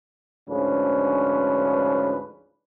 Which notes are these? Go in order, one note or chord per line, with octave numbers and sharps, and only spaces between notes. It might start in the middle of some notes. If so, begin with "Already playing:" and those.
D2 G#2 F3 C#4 D4 B4